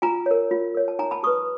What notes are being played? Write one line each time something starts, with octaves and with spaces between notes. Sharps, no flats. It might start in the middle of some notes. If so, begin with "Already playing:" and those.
F4 G#5 A#5
A#4 C#5
F4
A#4 C#5
A5
D#4 G#5 A#5
A5 B5
G4 B4 C#6 D#6